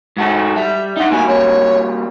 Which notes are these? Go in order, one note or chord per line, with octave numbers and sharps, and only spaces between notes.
G#2 F#4 A4
G3 E5
D#4 E5 F#5
G3 A#3 F#4 G#5
C#5